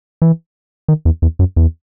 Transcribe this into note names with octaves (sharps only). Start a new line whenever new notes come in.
E3
D#3
E2
E2
F#2
E2